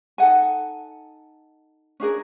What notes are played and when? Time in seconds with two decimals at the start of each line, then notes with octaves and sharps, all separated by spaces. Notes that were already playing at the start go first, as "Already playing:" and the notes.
0.18 D#4 A4 F#5 G#5
2.00 C#4 D4 G#4 A#4